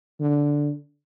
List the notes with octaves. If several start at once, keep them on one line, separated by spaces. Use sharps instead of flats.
D3